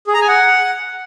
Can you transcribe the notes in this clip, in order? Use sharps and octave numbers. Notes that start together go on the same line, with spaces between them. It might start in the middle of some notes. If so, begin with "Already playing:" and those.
G#4
A#5
G#5
F#5